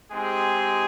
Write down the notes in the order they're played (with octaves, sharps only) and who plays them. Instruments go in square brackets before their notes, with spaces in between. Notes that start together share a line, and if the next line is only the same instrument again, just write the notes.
[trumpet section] G#3 C4 D#4 G4 G#4